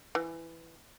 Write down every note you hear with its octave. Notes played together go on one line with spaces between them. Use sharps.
E3